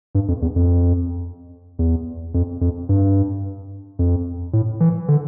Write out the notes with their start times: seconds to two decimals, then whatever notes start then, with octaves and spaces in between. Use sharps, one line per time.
0.15 G2
0.28 F2
0.42 E2
0.56 F2
1.79 E2
2.34 F2
2.61 F2
2.89 G2
3.99 F2
4.53 A2
4.80 E3
5.08 D3